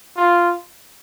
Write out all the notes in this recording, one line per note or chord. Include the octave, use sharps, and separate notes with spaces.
F4